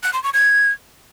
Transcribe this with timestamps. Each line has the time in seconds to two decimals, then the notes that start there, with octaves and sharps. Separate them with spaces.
0.03 F#6
0.13 C6
0.23 C#6
0.34 G#6